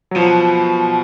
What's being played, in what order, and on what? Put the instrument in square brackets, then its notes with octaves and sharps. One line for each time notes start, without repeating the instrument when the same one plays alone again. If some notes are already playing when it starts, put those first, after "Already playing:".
[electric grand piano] F#3
[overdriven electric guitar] B2 [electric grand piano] F3